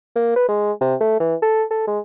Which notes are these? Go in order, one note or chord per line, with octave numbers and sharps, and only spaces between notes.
A#3
B4
G#3
C3
A3
E3
A4
A4
G#3